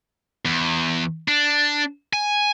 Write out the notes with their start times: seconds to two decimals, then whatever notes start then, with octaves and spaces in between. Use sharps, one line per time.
0.45 E2
1.28 D4
2.13 G#5